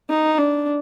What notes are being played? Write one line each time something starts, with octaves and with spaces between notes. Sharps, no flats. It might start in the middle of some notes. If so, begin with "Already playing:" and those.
D#4
D4